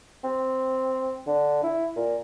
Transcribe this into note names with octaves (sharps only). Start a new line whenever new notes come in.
C4
D3
E4
A#2